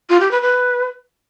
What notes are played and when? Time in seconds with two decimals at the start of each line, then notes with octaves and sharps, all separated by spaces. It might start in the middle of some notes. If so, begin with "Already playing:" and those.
0.10 F4
0.20 G4
0.31 B4
0.42 B4